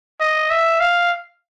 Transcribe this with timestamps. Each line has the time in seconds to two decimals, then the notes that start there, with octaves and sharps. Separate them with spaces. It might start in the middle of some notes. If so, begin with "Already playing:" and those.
0.21 D#5
0.50 E5
0.80 F5